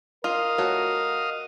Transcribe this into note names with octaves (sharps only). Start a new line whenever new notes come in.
F4 A#4 D#5 F5
A3 F#4 C#5